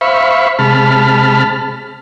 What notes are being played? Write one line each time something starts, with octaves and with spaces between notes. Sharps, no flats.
C5 E5 F5 B5 C#6
C3 G#3 A5 B5 F6